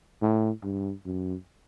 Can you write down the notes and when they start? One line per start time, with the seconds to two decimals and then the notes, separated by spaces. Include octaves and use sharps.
0.22 A2
0.63 G2
1.05 F#2